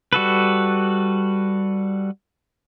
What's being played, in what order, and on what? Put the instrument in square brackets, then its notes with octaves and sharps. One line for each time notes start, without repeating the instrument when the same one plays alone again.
[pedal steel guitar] G3 F#4 A4 B4